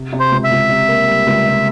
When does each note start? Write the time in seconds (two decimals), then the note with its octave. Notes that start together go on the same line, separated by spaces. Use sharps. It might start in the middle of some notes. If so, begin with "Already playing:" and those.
Already playing: C3
0.13 C3
0.20 C5
0.31 C#2
0.44 E5
0.51 C#2
0.69 C3
0.88 A#3
1.08 G3
1.26 C#2
1.45 C3